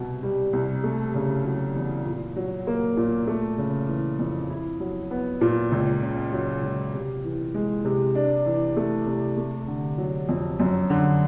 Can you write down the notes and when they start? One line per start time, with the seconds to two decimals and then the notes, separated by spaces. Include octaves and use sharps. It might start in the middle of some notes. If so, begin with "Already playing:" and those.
Already playing: C2 B2
0.23 G3
0.53 C2
0.83 A3
1.15 C#3
1.45 F#3
1.76 E2
2.06 A#2
2.36 F#3
2.67 A#3
2.97 A#2
3.27 A3
3.58 C#3
3.88 E3
4.19 F2
4.49 E4
4.80 F#3
5.11 B3
5.41 A#2
5.72 C#2
6.02 C#3
6.33 F#3
6.63 C#2
6.94 C3
7.24 E3
7.54 G#3
7.85 C3
8.15 D4
8.46 E3
8.76 A3
9.07 C3
9.37 A3
9.68 D3
9.98 F#3
10.29 F2
10.60 F#2
10.90 D3